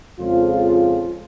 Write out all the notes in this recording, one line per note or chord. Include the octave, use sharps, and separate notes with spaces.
F2 C#3 F3 G#3 F4